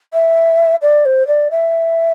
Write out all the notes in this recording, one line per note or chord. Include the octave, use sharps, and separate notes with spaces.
E5
D5
C5
D5
E5